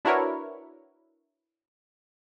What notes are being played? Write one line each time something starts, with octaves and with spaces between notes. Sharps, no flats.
D4 E4 F#4 A#4 B4 C#5